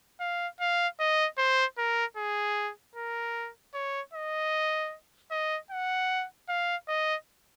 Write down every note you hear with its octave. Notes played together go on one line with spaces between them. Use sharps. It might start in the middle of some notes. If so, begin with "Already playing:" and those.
F5
F5
D#5
C5
A#4
G#4
A#4
C#5
D#5
D#5
F#5
F5
D#5